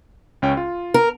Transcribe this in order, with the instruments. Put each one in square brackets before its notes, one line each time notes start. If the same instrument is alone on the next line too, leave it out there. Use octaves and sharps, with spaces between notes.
[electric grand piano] C#2 C#4 G5
F4
[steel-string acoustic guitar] A#4